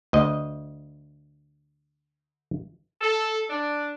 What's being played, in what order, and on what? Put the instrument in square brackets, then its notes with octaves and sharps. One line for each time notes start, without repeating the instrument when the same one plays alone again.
[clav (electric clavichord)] D2 D#5
[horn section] A4
D4